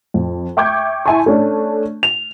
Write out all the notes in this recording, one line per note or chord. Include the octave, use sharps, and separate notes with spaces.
F2
E5 G5 C#6 D6 G6 G#6
E4 E5 G#5 A5 C6 C#6
A3 C#4 D4
F7